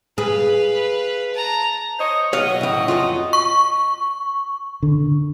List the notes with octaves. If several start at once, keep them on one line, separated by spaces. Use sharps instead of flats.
G#4 B4 F5
A5 A#5
C5 C#5 D#5
B1 F#3 F#4 C#5 D#5 F5
A2 C#3
F2 F4
C#6
D3